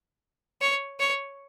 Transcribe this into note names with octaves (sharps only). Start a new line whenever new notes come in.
C#5
C#5